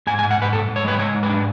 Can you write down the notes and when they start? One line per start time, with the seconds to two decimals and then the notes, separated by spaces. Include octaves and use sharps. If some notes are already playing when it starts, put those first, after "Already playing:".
0.07 G#2 G#5
0.19 G#5
0.23 G#2
0.31 F#5
0.38 G#2 B4
0.53 G#2 A4
0.69 G#2
0.76 C#5
0.84 G#3 B4
0.99 G#3 C#5
1.15 G#2
1.23 B4
1.29 D4